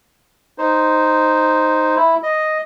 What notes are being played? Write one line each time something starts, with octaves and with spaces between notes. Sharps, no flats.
D#4 C5
E4
D#5